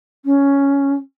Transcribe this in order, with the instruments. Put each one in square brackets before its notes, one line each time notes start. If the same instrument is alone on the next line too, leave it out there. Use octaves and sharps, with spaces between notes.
[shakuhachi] C#4